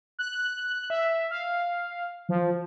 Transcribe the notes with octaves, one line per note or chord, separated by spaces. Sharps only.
F#6
E5
F5
F3